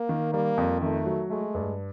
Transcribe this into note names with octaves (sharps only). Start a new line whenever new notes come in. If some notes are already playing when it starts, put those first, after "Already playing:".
Already playing: A#3
D#3
G3 A#3
F2
D#3 A3
F#3
G#3 A3
G2